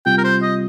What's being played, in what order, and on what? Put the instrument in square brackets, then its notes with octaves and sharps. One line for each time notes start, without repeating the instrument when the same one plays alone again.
[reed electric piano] C2 C3 G3 C4 F4 [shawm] G5
[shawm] A#4
C5
D#5